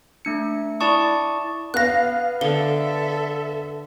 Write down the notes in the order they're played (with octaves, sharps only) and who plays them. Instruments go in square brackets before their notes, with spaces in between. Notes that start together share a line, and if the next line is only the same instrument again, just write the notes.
[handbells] A3 D4 C#7
E4 D5 A5 C#6 D#6
[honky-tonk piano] B3 F5 [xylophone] F#6 A#6
[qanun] D3 [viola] A4 E5 [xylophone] G7